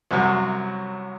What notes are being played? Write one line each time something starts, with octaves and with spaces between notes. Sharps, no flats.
C2 F#2 C3 F#3